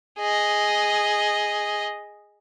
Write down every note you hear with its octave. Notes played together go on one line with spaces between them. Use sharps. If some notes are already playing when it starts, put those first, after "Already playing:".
G#4 D#5